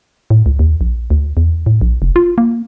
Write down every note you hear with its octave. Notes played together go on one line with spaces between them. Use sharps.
A2
C#2
D#2
A#1
D2
E2
A2
A#1
F1
F4
A#3